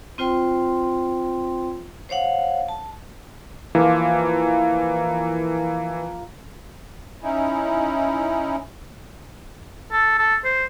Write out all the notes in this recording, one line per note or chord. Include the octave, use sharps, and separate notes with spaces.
C4 F4 C5 G5 C6
C5 C#5 F5 F#5
A5
E3 F3 A#3
C#4 D#4 E4
A4
A4
C5